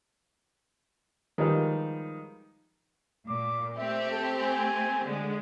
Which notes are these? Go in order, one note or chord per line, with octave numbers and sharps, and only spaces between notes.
D#3 F3 G3 G#3 D#4 B4
A#2 D6
A3 C4 G4 E5
A4
G#5
D3 G#3